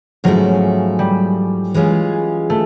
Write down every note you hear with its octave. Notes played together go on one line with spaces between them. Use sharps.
G#2 F3 F#3 A3 C#4 E4
G3
E3 G#3 C#4 F4 G#4
A3